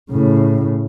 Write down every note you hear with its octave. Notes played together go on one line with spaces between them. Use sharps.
A2 C#3